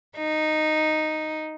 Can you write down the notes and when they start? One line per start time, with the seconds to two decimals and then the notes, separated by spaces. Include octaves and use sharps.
0.18 D#4